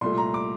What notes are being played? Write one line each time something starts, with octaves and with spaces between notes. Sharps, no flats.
C2 A#2 A3 C6
A#5
D6